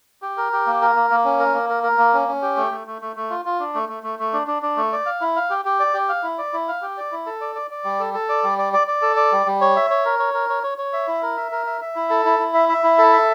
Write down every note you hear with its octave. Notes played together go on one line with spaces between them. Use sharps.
G4
A#4
G4
A#3
A#4
A#3
A#3
C#4
A#4
A#3
A#4
A#4
A#3
C#4
C#4
G4
A3
A3
A3
A3
A3
F4
F4
D4
A3
A3
A3
A3
D4
D4
D4
A3
D5
F5
E4
F5
G4
G4
D5
G4
F5
E4
D5
E4
F5
G4
D5
E4
A4
D5
D5
D5
G3
A4
A4
D5
G3
D5
D5
D5
A4
D5
G3
G3
C#5
E5
C#5
A#4
C#5
A#4
C#5
C#5
C#5
E5
E4
A#4
E5
A#4
E5
E5
E4
A4
E4
E4
E5
E5
E4
A4
E5